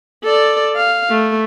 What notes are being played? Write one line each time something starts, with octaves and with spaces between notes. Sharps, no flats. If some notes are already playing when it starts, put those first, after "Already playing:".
A4 D5
F5
A3